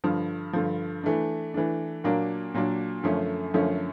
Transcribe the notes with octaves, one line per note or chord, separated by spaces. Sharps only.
G2 D3 F3
G2 D3 F3
E3 A3 D4
E3 A3 D4
A#2 F#3 A#3 D4
A#2 F#3 A#3 D4
F#2 D3 F3 A3 C#4
F#2 D3 F3 A3 C#4